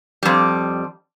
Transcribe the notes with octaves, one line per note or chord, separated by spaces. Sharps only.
F2 G3